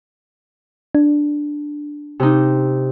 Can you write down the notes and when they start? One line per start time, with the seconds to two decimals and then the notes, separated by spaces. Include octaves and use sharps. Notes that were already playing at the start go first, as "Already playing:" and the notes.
0.95 D4
2.20 C3 D#4